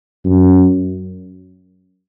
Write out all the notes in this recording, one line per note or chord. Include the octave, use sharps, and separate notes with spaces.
F#2